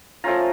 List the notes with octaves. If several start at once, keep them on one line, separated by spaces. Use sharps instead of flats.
F3 A3 C#4 F4 A#5